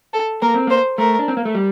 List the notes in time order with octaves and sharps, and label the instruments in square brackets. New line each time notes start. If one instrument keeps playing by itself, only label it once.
[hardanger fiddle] A4
[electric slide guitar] A#3 [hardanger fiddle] A#4
[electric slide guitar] C4
[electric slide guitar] A#3 [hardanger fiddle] C5
[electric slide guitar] A3 [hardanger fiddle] A#4
[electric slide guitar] D4
C4
A#3
A3
G3